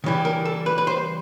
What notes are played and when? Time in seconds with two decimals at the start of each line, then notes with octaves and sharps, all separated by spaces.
0.04 C#3 E3 G3
0.25 A#4
0.45 A4
0.66 B4
0.78 B4
0.87 C5